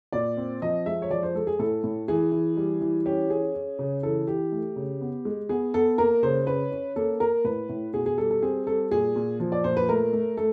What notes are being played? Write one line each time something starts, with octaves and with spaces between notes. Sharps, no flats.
A#2 D5
C4
F3 D#5
G#3 E5
C#5
F3 D5
C5
G#3 A4
G#4
A2 A4
A2
E3 G#4
E3
G3
E3
C#4 G4
C#4 G#4
C#4
C#3
E3 A4
E3 G4
A3
C#3
B3
G#3
B3 G#4
B3 A4
A#3 A#4
C#3 C5
C#4 B4
C#4
A#3 A4
A#3 A#4
A2 B4
A2
B2 G#4
G#4
G3 A4
A4
C4 G#4
G3 A4
A#2 G#4
A#2
F3
D5
A#2 C5
B4
A3 A#4
A3
A3 A4